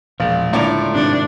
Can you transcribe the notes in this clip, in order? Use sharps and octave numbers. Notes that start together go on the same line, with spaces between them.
E1 A#1 F3 G#3
C#2 A2 D3 A#3 F4 D5 A#5
G#2 C3 D#3 D4